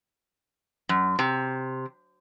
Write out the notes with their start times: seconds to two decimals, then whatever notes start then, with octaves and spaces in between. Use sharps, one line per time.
0.89 F#2
1.19 C3